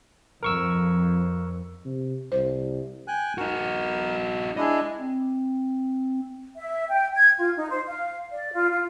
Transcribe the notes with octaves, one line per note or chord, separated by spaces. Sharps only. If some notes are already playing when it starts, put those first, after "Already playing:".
F2 A#4 C#6 E6
C3
C2 C5
G5 G#5 F#6
D#4 F#4 A#4
G#3 D4 E4 G#4 D#5
C4
E5
G5
G#6
F4
D#4
C5
F5
D5
F4
F4